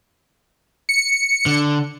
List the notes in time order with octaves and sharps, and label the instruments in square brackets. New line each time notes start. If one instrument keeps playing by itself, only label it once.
[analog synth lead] C#7
[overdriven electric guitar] D3